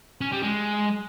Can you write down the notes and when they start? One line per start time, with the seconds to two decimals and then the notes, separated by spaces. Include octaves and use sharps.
0.21 C#4
0.32 G3
0.43 G#3